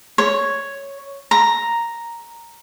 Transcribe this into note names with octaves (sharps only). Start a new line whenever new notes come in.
C#5
A#5